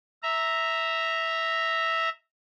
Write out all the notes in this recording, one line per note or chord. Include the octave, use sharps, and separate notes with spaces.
E5 A#5